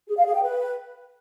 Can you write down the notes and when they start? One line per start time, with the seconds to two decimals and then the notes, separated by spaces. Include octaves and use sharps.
0.08 G#4
0.17 F5
0.25 G#4
0.34 G5
0.43 B4